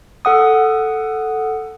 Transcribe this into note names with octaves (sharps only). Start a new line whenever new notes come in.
A4 F#5 D#6